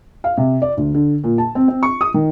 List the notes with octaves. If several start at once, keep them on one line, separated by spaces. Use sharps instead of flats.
F5
C3
D5
D2
D3
A#2
A5
C4
C4
C#6
D#6
D#3